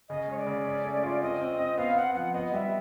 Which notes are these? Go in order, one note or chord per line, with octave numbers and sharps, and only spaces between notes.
C#3 D#5
G#3 C#5
D5
C#3
C#4
A3
F4
C4 D#5
C4
C4
B3 F5
B3 F#5
F3 F#5
B3 D#5
G3 E5